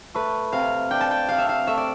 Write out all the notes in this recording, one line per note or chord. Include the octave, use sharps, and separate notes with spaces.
A3 B4
C3 F5
D4 G5
A5
G5
C3 F5
E5
F5
A3 E5
D5